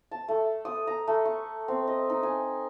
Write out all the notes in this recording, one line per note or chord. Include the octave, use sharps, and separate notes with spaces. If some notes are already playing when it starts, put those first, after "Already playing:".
A5
A3
D#6
A#5
A3
C#6
C4
D#5
D#4
G#5